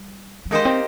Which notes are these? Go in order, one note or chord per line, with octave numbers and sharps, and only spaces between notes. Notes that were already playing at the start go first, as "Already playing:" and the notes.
Already playing: G3
G3
G#3 A#3 D#4 G4 C5 D#5
C4